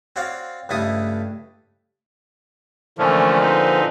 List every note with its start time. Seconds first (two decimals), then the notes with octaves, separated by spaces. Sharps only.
0.16 C4 F#4 C#5 D5 F5
0.69 C#2 G2 A3 E4 A4 D#6
2.98 A#2 D3 E3 F3 A3 C#4
3.40 C4 D#4 B4